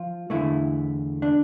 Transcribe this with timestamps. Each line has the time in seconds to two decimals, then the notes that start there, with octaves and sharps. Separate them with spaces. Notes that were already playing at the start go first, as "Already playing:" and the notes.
Already playing: F3 F4
0.30 E2 D3 A3 E4
1.22 D4